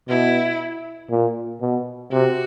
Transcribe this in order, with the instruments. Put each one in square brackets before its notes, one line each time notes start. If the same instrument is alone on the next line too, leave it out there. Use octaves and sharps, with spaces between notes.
[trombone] B2 [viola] E4
[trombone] A#2
B2
[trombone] C3 [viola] F#4